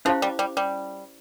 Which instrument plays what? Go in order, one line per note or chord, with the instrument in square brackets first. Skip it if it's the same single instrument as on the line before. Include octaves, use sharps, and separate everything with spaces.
[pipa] F3 [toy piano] C#4 E4 G4 C5 F5
[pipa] G3
G3
G3